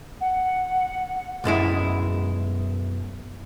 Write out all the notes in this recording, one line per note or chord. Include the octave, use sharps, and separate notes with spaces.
F#5
B1 F#2 G#3 E4